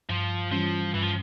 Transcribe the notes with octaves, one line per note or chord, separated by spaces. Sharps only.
G2 F3
E3 F3 G3 C#4 F4
G2 E3
F3